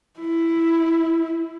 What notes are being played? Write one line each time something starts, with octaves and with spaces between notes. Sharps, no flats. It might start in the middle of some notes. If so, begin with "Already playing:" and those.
E4